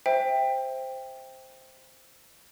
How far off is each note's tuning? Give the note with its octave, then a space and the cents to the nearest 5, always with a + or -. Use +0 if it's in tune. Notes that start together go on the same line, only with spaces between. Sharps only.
C5 +0 E5 -10 G5 +10